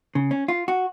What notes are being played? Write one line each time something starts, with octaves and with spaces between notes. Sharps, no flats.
C#3
C#4
F4
F#4